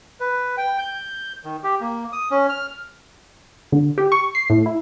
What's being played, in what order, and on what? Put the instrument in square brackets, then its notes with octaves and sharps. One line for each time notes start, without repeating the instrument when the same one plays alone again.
[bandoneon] B4
G5
G6
D#3
G4
A#3
D#6
C#4
F6
[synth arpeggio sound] D3
G4
C#6
C7
A2
E4